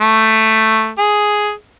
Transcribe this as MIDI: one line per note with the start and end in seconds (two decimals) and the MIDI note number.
0.01 0.91 57
0.99 1.52 68